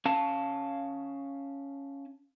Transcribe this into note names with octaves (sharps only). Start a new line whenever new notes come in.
C#4 F5 A5